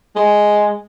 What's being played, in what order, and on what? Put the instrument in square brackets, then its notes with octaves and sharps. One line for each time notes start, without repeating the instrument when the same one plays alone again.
[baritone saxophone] G#3